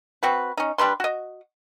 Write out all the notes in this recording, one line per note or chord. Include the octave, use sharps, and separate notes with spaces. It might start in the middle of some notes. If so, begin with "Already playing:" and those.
C4 F#4 B4
C#4 D#4
G3 D4 B4 C6
F#4 D#5